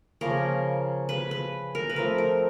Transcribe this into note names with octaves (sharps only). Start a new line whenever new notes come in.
C#3 F3 A#3 C#4 A#4
B4
B4
A#4
B4
F3 A3 C4 A#4
A#4